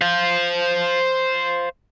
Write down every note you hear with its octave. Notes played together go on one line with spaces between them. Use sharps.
C5 F5